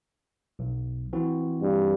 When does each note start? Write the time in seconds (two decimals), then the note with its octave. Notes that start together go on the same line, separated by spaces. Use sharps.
0.59 B1
1.13 E3 C4 F#4
1.61 G2